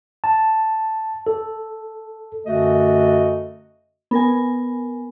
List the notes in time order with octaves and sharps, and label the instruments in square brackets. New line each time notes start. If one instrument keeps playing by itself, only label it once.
[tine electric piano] A5
A4
[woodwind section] F#2 D3 A3 F#4 D#5
[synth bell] B3 A#4 G#5